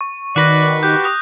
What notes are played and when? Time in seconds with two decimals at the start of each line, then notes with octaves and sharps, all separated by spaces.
0.01 C#6
0.36 D#3 F#4 B4 D5 F#6 A#6
0.83 G4 G6
1.03 D#6 F#6 A#6